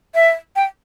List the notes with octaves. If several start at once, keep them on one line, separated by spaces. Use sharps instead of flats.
E5
G5